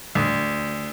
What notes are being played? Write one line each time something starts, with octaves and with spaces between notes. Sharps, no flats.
D2